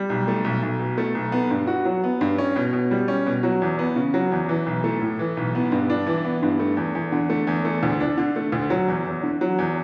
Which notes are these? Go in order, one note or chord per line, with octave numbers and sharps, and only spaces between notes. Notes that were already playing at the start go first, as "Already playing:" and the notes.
Already playing: G3
B1
A3
B1
B1
B2
A3
B1
B3
G2
F#4
F#3
B3
G2
C#4
B2
B2
G3
C#4
B2
F#3
E2
B3
C#3
F#3
E2
E3
B1
A3
A2
E3
B1
B3
G2
D4
E3
B3
G2
A3
E2
E2
D3
A3
E2
A3
D2
D4
D3
A3
D2
F#3
E2
E2
D3
F#3
E2